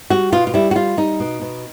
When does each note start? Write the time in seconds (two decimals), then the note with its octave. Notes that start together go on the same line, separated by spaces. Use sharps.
0.10 G3 F#4
0.32 B2 F4
0.47 F4
0.54 G3 E4
0.71 F#4
0.75 G3 F4
0.97 G3 D#4
1.20 B2
1.42 B2